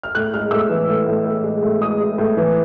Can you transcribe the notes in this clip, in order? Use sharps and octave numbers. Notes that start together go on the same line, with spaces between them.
F6
A2 F#6
G#3 F6
A2 E6
E3
A2
A2
A2
G#3
A2
G#3 D#6
G#3
A2
E3